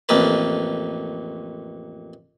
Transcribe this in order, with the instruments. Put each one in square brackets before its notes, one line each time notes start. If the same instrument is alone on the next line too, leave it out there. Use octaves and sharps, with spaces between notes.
[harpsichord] A1 F2 A#3 B4